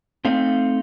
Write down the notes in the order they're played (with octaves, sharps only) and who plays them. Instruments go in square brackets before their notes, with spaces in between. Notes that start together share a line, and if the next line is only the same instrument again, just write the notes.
[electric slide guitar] A3 C4 D#4 F5